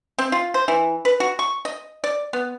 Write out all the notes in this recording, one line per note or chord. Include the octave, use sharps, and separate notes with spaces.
C4
F4
C5
E3
B4
F#4
C#6
D#5
D5
B3